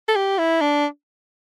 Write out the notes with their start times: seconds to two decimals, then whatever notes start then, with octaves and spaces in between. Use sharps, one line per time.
0.09 A4
0.16 G4
0.39 E4
0.61 D4